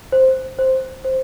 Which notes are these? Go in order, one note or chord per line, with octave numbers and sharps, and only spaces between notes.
C5
C5
C5